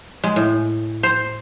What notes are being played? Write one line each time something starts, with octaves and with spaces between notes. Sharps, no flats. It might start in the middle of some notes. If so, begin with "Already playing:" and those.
G#3
A2
C5